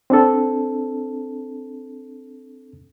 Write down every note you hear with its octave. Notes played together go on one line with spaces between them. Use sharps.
C4 D4 A4